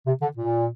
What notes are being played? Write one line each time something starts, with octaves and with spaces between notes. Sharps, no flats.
C3
D3
A#2